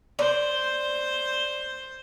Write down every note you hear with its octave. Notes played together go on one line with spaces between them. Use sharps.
C5 D5